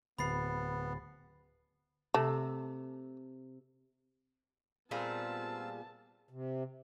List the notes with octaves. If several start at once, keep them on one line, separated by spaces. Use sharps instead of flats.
D1 B3 B5 A6 C7
C3 A3
A#2 G3 B3 C4 F4 G#4 A5 E6
C3